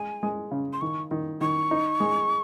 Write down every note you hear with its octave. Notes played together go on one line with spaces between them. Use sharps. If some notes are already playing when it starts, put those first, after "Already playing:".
Already playing: G#3 G#5
G#3
C#3
C6
D#3 C#6
D#3
D#3 C#6
D#4
G#3